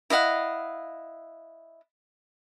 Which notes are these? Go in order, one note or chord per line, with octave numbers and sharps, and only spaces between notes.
E4 D#5 F5 F#5